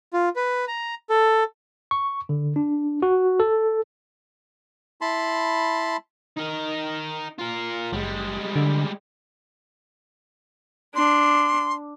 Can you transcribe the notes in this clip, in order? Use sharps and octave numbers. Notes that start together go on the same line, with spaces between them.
F4
B4
A#5
A4
C#6
D3
D4
F#4
A4
E4 A5 B5 C6
D#4 A#4
F4 A#4
F#1 G3 G#3
D3
D4 C6